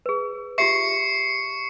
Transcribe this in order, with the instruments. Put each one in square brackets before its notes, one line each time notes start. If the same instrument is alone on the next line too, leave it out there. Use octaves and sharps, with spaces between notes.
[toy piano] G#4 B4
[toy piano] F4 G4 E5 [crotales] C#6 C7 C#7